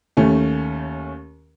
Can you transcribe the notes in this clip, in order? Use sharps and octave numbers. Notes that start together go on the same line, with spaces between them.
D#2 A3 C#4